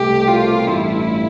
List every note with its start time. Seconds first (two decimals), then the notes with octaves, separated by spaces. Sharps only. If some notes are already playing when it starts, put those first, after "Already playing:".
Already playing: C2 B2 A3 G4
0.28 F4
0.67 A1 G2 E3 A3 E4